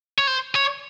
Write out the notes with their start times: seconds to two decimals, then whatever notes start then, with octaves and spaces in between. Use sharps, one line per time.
0.18 C#5
0.27 C5
0.55 C#5